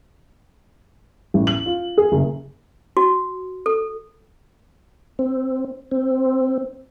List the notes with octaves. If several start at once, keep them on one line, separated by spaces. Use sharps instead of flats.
A1
F#7
F4
G#4
F#1
F#4
A4
C4
C4